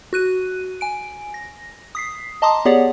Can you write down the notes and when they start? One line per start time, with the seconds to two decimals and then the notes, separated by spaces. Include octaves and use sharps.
0.13 F#4 F#6 D#7
0.81 G#5 D7
1.34 A#6
1.95 D#6 B6 C7
2.42 D#5 A5 A#5 C6 D6 D#6
2.65 B3 G4 G#4 C#5 D5 F#5